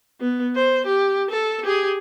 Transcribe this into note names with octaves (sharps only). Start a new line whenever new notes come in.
B3
C5
G4
A4
G4 G#4